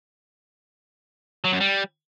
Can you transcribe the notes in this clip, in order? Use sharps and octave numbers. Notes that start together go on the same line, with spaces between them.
F#3
F#2
G3